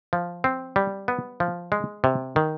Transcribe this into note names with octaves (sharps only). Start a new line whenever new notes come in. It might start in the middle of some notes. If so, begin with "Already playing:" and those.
F3
C4
G3
B3
F3
G#3
C3
D#3